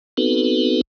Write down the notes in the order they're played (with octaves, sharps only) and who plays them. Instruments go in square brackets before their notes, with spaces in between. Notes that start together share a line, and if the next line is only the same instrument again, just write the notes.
[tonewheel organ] B3 C4 D#4 F#4 A4 B4